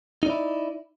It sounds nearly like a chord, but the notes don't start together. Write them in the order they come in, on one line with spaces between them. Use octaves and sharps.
D#4 D5 E4